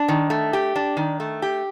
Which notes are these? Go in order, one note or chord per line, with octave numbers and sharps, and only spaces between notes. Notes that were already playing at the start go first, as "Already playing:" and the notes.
Already playing: D4
D#3
A3
G4
D4
D#3
A3
G4